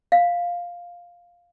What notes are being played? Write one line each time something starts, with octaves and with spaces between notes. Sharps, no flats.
F5